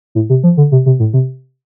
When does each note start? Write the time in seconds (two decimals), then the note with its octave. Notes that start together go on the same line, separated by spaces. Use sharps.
0.15 A2
0.30 C3
0.43 F3
0.57 D3
0.72 C3
0.86 C3
1.00 A2
1.13 C3